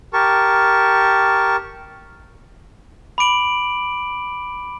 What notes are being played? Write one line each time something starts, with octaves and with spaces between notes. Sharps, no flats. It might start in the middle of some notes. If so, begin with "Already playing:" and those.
G4 A#4 A5 C#6
B5 D6 D7 F#7